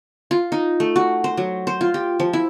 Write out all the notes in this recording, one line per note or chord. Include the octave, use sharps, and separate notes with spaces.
F4
D#4
A3
F#4
C5
F#3
C5
F4
G4
F3
E4